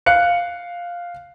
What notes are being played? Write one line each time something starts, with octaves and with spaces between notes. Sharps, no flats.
F5 F#6 C#7